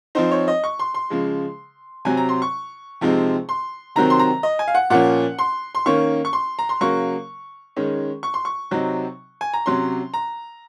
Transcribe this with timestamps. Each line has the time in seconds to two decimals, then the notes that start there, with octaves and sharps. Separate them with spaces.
0.15 F3 C4 D#4 C5
0.31 C#5
0.48 D#5
0.64 C#6
0.79 C6
0.94 C6
1.10 C#3 F3 G#3
2.05 C3 F#3 C4 G#5
2.17 A#5
2.29 C6
2.42 C#6
3.01 C3 F3 G#3 C4 D#4
3.49 C6
3.96 C3 D#3 F#3 C4 A#5
4.10 C6
4.19 A#5
4.43 D#5
4.59 G#5
4.68 F5
4.75 F#5
4.90 A#2 F3 A#3 C#4 F#5
5.39 C6
5.75 C6
5.86 D#3 A#3 C#4 C#6
6.25 C#6
6.33 C6
6.59 A#5
6.69 C6
6.81 C#3 F#3 A#3 C#6
7.76 D#3 G#3 C#4
8.23 C#6
8.34 C6
8.45 C#6
8.71 C3 F#3 C4 D#4
9.41 G#5
9.54 A#5
9.66 C3 F#3 C#4 C6
10.14 A#5